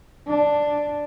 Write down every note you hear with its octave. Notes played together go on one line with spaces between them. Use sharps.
D4